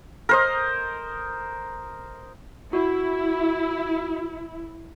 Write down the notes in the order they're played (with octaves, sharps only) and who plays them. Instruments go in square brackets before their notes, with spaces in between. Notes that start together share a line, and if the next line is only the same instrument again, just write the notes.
[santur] A#4 C5 D#5
[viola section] E4 [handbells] F#4